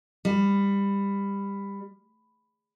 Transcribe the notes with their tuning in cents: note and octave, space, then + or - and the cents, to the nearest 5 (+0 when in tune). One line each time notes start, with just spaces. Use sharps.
G3 +20